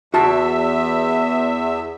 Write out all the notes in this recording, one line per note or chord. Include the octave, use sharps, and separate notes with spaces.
E2 F#4 E5 A5